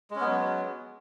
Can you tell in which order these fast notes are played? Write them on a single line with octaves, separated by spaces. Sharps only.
G#3 C#4 B3 F#3